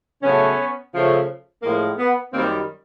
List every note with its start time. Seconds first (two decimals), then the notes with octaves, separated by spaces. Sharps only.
0.23 C#3 F#3 A3 B3 C#4
0.93 C#3 F3 A3
1.63 A2 F3 G#3 A#3
1.98 B3
2.33 F#2 D#3 G3 A#3 C4